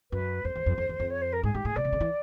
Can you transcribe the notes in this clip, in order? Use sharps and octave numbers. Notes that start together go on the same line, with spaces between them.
F#2 B4
F2 C5
E2
F2
F2
E2
F2
C#5
C5
A#4
G#2 G#4
G#2 G4
A2 G#4
B2 D5
C3
C#3
E3